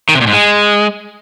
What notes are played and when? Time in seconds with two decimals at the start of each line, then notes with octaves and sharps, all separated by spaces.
0.09 D#3
0.15 C3
0.21 A#2
0.27 G#2
0.33 G#3